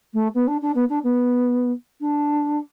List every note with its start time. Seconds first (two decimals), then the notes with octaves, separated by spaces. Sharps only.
0.13 A3
0.34 B3
0.47 D4
0.62 D4
0.75 B3
0.89 D4
1.04 B3
2.00 D4